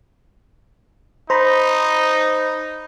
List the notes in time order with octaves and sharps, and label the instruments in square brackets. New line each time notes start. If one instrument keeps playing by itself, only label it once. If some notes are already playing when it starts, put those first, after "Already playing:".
[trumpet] D#4 [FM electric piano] C5 A#5 B5